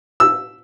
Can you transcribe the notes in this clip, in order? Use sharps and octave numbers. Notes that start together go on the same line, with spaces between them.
E6